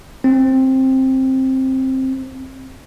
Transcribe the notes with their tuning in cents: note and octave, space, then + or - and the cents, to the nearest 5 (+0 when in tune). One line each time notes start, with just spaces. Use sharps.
C4 +10